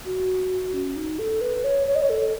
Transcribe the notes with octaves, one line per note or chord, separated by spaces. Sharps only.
F#4
C#4
D#4
A4
B4
C#5
C#5
D#5
C#5
A4